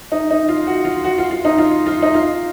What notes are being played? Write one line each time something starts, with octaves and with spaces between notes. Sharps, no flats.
D#4
D#4
F4
F#4
F4
F#4
F4
F4
D#4
F4
F4
D#4
F4